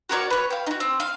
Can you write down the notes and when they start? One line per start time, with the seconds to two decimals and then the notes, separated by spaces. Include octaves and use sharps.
0.09 F#4 A#4 C#5 D5
0.30 B4 C#5
0.50 F5 G5
0.66 D#4 F#4
0.80 C4
1.00 F5